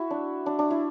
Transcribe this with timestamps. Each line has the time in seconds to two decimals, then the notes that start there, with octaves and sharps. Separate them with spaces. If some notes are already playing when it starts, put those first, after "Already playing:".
Already playing: E4 F#4
0.11 D4
0.46 D4
0.59 D4
0.71 E4